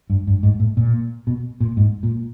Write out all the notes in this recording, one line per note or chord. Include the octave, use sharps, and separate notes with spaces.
G2
G2
G#2
A2
A#2
B2
A#2
G#2
A#2